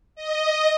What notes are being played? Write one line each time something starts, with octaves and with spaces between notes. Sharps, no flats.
D#5